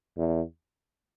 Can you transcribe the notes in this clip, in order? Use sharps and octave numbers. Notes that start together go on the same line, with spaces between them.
E2